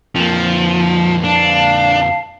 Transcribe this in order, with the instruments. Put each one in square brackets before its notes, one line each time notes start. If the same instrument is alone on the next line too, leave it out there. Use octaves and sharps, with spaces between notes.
[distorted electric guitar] F2 A#3 [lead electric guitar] F3
[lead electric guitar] D4 [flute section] F5 A5